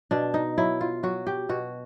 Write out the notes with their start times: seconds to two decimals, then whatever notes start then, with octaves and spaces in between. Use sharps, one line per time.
0.11 B2 D4
0.34 D#4
0.58 F#3 E4
0.81 F4
1.03 F#3 F#4
1.27 G4
1.49 B2 F#4